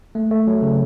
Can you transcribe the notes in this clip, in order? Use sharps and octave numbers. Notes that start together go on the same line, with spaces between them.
A3
A3
F#3
C#3